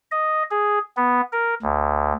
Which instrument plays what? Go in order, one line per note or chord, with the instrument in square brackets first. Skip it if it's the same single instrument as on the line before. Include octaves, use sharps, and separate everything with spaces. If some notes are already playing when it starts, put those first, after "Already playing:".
[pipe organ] D#5
G#4
B3
A#4
D2